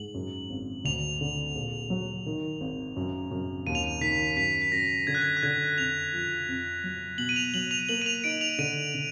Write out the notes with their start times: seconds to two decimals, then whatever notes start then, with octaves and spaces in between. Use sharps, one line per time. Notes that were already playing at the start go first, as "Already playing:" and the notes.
Already playing: G#2 F#7
0.14 F#2
0.50 G#1
0.84 D2 F7
1.21 D3
1.55 A#1
1.90 F#3
2.26 D#3
2.61 G#1
2.96 F#2
3.31 F#2
3.66 D#2 D#7
3.75 F7
3.84 D#7
4.01 D#3 B6
4.36 F#2 B6
4.62 B6
4.72 F#2 A#6
5.07 D3 G#6
5.15 F#6
5.22 G#6
5.37 F#6
5.43 D3 G#6
5.78 F2 F7
6.12 F3
6.48 F2
6.84 F#3
7.18 B2 F#7
7.29 D#7
7.36 F7
7.54 F#3 F#7
7.71 F7
7.89 A#3 F#7
8.02 D#7
8.06 F7
8.24 D#4 D7
8.41 F7
8.58 D3 D#7
8.94 D3